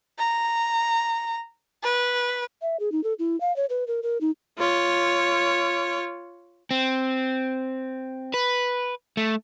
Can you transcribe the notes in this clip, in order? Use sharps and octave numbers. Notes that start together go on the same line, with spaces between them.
A#5
B4
E5
G#4
D#4
A4
E4
F5
C#5
B4
A#4
A#4
D#4
F4 C#5
C4
B4
A3